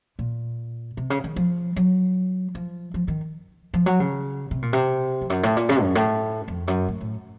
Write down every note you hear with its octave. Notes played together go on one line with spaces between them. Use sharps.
A#2
C3
C#3
D#3
F3
F#3
F3
F3
D#3
F3
F#3
C#3
C3
A#2
C3
F2
F#2
A2
A#2
C#3
F#2
A2
F2
F#2
A2
A2